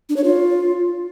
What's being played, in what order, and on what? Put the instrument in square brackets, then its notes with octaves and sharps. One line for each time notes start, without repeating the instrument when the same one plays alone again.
[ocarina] D4
C#5
F4